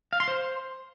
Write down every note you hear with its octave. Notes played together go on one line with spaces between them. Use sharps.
F5
C6
C5